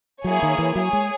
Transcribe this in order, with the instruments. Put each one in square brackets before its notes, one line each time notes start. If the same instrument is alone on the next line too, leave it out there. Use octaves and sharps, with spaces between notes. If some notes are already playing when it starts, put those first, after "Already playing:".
[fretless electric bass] F#3 [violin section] A#3 E4 G#4 C#5 G#5
[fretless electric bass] D#3
E3
[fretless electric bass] F#3 [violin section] G#4 C#5 G#5
[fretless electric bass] G#3